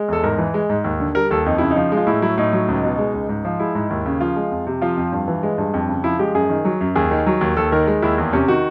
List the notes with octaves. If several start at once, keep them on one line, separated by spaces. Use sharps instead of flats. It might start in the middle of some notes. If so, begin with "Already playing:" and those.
Already playing: G#3
E2 A4
G#2 A#4
E3
G#3
G#2
D#2
D3
G3 A#4
D#2 A4
F2 D#4
C#3 E4
D#4
F3
G#3
F4
A2 E4
F#3 E4
A2 D#4
F#3
C#2
B2
G#3
C#2
G#2
F3
G#3 E4
G#2
D#2
C#3
F3 F4
G#3
F2
C3
F3 F4
F2
G2
E3
G#3
G2
F2
C#3
F3 E4
G#3 G4
F#2 G#4
D#3
F#3
F#2
D#2 G#4
D#3
F#3
D#2
D#2 A4
D#3 A#4
G#3
D#2 E4
E2
C3 C#4
D#3 F#4